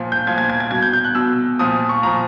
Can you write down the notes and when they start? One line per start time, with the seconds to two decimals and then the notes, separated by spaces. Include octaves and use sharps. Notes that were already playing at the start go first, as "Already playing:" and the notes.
Already playing: A#2 F3
0.12 G6
0.27 A#2 F3 G#6
0.38 G#6
0.50 G#6
0.60 G#6
0.71 B2 G#6
0.82 G6
0.93 G6
1.04 F#6
1.15 B2 E6
1.59 A#2 F3 D#6
1.89 C#6
2.03 A#2 F3 A#5